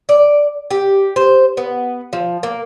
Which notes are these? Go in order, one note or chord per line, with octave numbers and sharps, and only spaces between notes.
D5
G4
C5
B3
F3
A#3